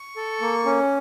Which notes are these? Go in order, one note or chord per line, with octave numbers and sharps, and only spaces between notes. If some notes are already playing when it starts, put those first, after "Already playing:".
Already playing: C#6
A4
A#3
C#4